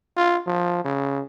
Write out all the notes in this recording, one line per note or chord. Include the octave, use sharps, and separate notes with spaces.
F4
F3
C#3